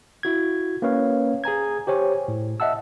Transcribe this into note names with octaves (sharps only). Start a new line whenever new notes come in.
E4 F#4 G#6
A#3 C#4 B4 C#5 F5
G#4 G#5 A#5 G#6
G4 C5 C#5 G#5
A2
D#5 E5 F#5 A5 E6